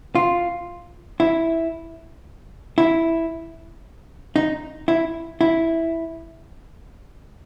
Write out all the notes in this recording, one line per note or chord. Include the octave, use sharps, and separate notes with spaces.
F4
E4
E4
D#4
E4
E4